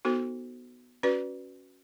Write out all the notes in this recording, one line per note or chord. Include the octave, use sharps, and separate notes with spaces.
B3 D#4 F#4 A4 C5
C#4 F#4 B4 D5